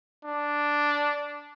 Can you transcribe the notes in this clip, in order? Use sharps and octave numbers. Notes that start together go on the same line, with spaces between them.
D4